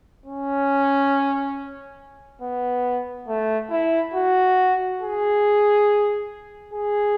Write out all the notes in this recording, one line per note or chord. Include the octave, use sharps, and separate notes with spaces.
C#4
B3
A3
E4
F#4
G#4
G#4